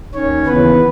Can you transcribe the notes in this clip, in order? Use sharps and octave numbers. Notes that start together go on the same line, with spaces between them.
D#2 D#3 C#4 C#5
D#2 C#3 E3 B3 B4